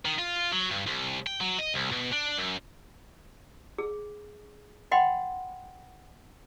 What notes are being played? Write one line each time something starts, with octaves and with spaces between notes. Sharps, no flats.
D#3
F4
F#3
G2
C2
G5
F#3
D#5
C2
B2
D4
F#2
G#4
D#5 F#5 G5 B5 C6